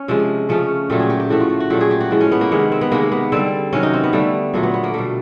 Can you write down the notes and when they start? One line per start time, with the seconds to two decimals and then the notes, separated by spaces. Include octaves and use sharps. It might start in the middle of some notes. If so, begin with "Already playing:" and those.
Already playing: C#4
0.08 C3 F3 G#3
0.49 C#3 F3 A3 C#4
0.90 A#2 F#3 A3 G4
1.00 G#4
1.10 G4
1.20 G4
1.29 A2 F3 A3 F#4
1.40 F4
1.50 F#4
1.60 F#4
1.70 A#2 F#3 A3 G4
1.80 G#4
1.91 G4
2.00 F#4
2.11 A2 F3 G#3
2.21 C#4
2.32 B3
2.41 A#3
2.51 C3 D#3 G#3 B3
2.72 C4
2.81 B3
2.91 C3 D#3 G#3 A#3
3.12 B3
3.32 D3 G3 C4
3.73 C3 D#3 F#3 C#4
3.83 D#4
3.93 C4
4.03 B3
4.13 D3 G3 A3
4.53 A#2 F#3 A3 A#3
4.63 B3
4.74 B3
4.84 A#3
4.94 B2 G3 A3